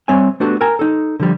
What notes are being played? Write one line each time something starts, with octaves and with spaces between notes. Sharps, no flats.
G3 C4 C#5 E5 G#5
A3 B3 D4 F#4 G4 A4
A#4 G5 G#5 A#5
D#4 A4
D3 F3 G3